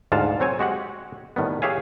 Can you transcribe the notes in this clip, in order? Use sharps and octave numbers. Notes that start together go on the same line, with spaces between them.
D2 G#2 F4 F#5 A5
F#3 C4 C#5 G#5
G#3 F#4 G4 F#5
A2 D#3 G3 B3
G4 G#4 C#5 E5 F5 G#5